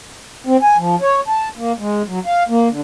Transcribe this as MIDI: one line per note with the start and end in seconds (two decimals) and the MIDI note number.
0.47 0.57 60
0.62 0.77 80
0.77 0.96 53
1.02 1.20 73
1.28 1.49 81
1.57 1.72 58
1.78 2.02 56
2.07 2.19 54
2.26 2.43 77
2.49 2.68 58
2.69 2.81 50